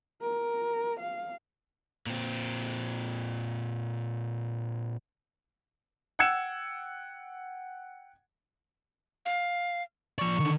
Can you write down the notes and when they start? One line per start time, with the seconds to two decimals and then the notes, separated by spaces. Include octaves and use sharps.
0.22 A#4
1.00 F5
2.06 A#2 C4
6.19 F#5 G5 E6 G#6 C#7 E7
9.26 F5
10.19 F3 D5 C#6
10.39 D3 D#3